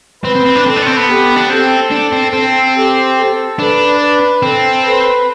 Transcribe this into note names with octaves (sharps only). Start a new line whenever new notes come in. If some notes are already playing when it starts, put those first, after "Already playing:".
C4 B4
C4
C4
D4
C4 A4
D4
B3
C4
B3
G4
D4
C4 A4
D4
C4
C4 A4
G4
A4
D4 B4
B4
C4 A4
B4